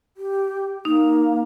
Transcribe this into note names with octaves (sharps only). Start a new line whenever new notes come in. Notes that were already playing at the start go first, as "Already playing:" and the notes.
G4
A#3 D#4